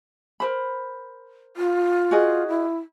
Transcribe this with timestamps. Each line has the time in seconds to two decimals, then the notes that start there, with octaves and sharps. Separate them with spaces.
0.40 A#4 C5 B5
1.57 F4
2.11 F#4 G#4 D#5
2.48 E4